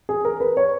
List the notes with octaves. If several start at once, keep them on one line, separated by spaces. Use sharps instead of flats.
G#4
A#4
B4
C#5